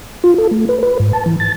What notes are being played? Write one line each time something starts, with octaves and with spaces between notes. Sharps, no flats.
F4
A4
A3
B4
B4
G#2
A5
E3
A6